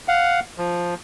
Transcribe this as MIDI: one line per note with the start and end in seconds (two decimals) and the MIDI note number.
0.08 0.40 77
0.08 0.40 78
0.58 0.95 53